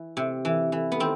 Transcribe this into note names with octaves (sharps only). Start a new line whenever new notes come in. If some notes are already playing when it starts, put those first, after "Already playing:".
Already playing: E3
C3
E3
E3
B3
D#3 C4